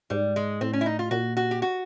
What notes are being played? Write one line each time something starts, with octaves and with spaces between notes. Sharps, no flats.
G#2 G3
G#3
A2 C4
C#4
E4
D#4
F4
A#2 F#4
F#4
G4
F#4